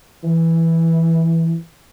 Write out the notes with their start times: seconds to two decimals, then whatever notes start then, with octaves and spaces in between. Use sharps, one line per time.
0.24 E3